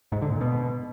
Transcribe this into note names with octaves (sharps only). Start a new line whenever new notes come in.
G#2
D3
A#2
B2